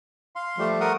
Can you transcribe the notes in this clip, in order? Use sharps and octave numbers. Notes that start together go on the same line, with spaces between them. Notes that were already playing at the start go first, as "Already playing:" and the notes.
F5 C6
F3 G3 A3
A#4 F#5 D#6